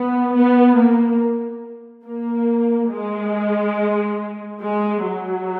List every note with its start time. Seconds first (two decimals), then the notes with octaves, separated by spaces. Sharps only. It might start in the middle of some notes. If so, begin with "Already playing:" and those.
Already playing: B3
0.33 B3
0.77 A#3
2.06 A#3
2.91 G#3
4.61 G#3
5.05 F#3